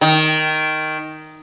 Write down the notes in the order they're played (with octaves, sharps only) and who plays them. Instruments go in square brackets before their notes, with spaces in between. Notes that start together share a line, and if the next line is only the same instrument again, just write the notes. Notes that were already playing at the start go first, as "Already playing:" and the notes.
[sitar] D#3